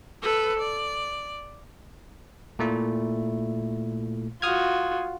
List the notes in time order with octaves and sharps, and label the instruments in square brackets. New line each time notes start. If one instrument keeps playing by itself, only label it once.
[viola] A4 B4
D5
[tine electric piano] A#2 A3 E4
[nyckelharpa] F4 F#4 [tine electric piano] D#6 F6 G#6